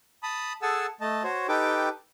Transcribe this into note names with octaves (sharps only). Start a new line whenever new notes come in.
A5 B5 D#6
G#4 A4 F#5 G#5 A5 E6
A3 D#5 A5
F#4 C5 C#5
D#4 G4 A4 B4 G5 D6